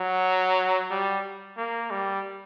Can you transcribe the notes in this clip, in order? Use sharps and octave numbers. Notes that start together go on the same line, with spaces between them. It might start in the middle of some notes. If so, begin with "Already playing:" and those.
Already playing: F#3
G3
A#3
G3